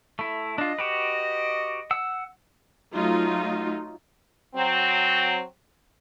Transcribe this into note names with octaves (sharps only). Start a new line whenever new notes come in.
A3 E4
D4 F4 D#5
F#4 G4 B4
F#5 E6
F#3 A3 D#4 F4
F#3 C4